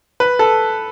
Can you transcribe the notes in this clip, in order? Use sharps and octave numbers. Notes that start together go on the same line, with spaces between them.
B4
A4